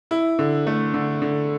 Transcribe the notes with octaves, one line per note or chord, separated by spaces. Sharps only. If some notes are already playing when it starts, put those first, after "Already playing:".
E4
D3
A3
D3
D3